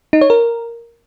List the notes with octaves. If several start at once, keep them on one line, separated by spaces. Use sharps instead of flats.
D#4
C#5
A#4